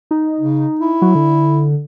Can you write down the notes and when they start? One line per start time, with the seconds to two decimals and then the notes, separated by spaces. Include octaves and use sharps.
0.11 D#4
0.40 C#3
0.81 E4
1.02 F#3
1.15 D3